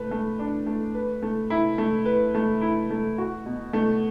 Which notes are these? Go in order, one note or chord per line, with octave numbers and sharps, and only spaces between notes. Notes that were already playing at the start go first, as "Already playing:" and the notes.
Already playing: A3 B4
A3
D4
A3
B4
A3
E4
A3
B4
A3
E4
A3
F#4
B2
A3